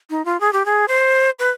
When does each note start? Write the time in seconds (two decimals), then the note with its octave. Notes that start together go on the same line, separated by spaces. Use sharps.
0.10 D#4
0.25 F4
0.40 G#4
0.53 G4
0.65 G#4
0.88 C5
1.39 B4